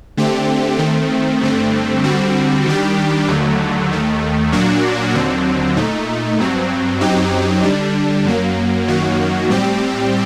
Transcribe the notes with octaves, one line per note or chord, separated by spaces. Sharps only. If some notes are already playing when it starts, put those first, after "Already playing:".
D3 A3 C4 G4
D#3 A3 C4
G2 D3 A3 C4
D3 G3 C4 F#4
D#3 G3 D4 G4
D#2 D3 F#3 A3
D#2 D#3 A3
A#2 F#3 A#3 D4 F#4
D#2 D3 F#3 C4
A#2 A3 D#4
G2 F#3 C4
F#2 F#3 C4 D#4 G4
D3 G3 D4
F#2 F#3 A#3
F#2 D#3 F#3 A#3 F#4
A2 G3 C4 G4